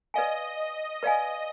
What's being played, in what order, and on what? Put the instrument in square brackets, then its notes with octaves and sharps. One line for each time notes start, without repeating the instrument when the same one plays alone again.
[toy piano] B4 D5 F5 G#5 [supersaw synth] D#5
[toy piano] B4 D5 F5 G#5